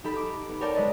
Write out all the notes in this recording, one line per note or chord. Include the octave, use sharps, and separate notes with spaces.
D#4 G4 A4 B5
D6
B3
G4 A#4 C#5 D5 G5 A5
G#3 B4 D#5 A6